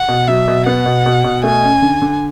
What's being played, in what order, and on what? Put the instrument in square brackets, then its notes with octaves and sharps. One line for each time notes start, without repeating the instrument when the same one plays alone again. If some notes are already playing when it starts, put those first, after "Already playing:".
Already playing: [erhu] F#5
[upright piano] B2
[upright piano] F#3 [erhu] E5
[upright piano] B2
[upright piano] B3 [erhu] F#5
[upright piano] B2
B2
B2
[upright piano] A3 [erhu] G#5
[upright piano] C#4
D3
D3